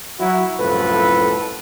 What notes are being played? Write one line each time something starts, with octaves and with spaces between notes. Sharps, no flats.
F#3 E4 F#4
C2 F#2 A2 F3 A4 B4